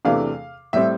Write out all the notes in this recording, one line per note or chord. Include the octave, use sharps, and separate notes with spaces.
E2 C3 E3 A3 D4 F5
A2 G3 C4 E5